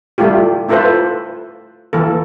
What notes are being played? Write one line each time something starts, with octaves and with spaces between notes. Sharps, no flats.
G3 A3 E4 F4 G4
A3 E4 F4 A4 B4 C5
E3 A#3 A4